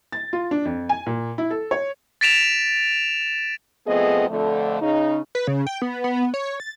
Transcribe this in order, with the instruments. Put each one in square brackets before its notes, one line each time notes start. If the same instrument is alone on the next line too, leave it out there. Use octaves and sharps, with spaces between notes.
[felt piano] A6
F4
D4
F2
G#5
A#2
E4
A4
C#5
[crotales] A6 B6 D7 E7 F7
[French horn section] F3 A3 B3 C4 G#4 D#5
F2 D3 A3
C#3 D#4
[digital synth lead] B4
C#3
G5
B3
B3
C#5
A6